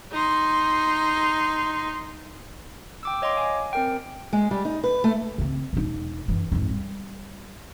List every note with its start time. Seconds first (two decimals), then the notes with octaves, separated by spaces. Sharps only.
0.12 D#4 C6
3.03 G5 D6 E6
3.22 C#5 D#5 F5 C6 D6
3.37 G#5
3.73 C4 A#4 G5
4.33 G#3
4.51 G3
4.65 D#4
4.84 B4
5.04 A3
5.38 C#3 C4
5.73 E1 D#4
6.28 F#2 E3
6.52 F2 G#2
6.69 G3